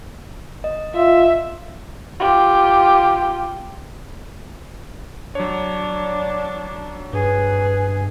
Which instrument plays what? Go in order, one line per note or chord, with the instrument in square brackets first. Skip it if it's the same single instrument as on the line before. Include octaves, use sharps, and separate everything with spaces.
[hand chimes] D#5
[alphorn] F4 [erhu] E5
[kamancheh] F4 G4
[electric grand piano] F#3 C#5 [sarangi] D4
[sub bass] G2 [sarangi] G#4 [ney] B4